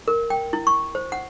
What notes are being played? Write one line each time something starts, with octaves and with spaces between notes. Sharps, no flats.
A#4
G5
E4
C#6
C5
F#5